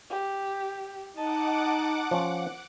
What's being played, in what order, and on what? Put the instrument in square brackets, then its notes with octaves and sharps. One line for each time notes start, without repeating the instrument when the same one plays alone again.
[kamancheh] G4
[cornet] D#4 [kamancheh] D#5 A5 [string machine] F#5 D6
[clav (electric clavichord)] F3 C#4